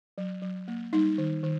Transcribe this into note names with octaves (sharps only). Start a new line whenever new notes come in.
F#3
F#3
A#3
G3 D#4
D#3
D#3